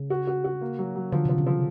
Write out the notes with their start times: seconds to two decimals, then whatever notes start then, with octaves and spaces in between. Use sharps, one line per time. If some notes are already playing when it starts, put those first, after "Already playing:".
Already playing: C#3
0.10 F#4
0.27 F#4
0.44 F#4
0.61 A#3
0.79 F#3
0.96 F#3
1.12 D3 F3
1.25 C3 F3
1.38 C#3
1.46 F3